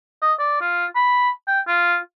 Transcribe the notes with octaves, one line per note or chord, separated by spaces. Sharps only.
D#5
D5
F4
B5
G5
F4